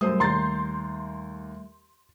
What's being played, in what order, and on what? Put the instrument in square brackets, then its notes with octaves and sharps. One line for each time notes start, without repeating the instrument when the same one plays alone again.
[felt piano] F#2 C5 D#6 [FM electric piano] G3 A3 E5
[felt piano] D#2 A#5 A6 [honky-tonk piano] C6 G6